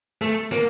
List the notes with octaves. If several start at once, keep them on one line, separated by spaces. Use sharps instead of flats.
A3
A#3